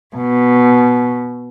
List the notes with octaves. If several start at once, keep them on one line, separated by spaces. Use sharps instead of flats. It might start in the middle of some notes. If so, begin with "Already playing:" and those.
B2